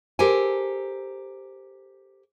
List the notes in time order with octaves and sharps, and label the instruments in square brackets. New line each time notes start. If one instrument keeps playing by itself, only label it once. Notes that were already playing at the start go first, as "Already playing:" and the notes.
[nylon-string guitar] G4 A4 A#4 C5 G#5